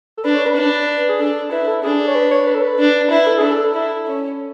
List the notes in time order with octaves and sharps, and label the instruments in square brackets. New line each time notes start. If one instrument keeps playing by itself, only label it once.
[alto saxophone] A4
[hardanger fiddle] D4 [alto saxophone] B4
[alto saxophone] C#5
B4
[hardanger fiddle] D4
[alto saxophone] G#4
[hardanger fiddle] D4 [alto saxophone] A4
[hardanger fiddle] E4 [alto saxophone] B4
[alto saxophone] A4
[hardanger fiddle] D4 [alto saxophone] G#4
[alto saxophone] C#5
B4
C#5
B4
A4
B4
[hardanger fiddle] D4
[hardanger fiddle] E4 [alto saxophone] B4
[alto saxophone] A4
G#4
[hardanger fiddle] D4 [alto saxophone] A4
[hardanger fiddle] E4
C#4